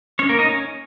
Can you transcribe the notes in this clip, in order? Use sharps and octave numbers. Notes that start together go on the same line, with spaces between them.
C#4 C#5
A#3 A#4
D#4 D#5
C#4 C#5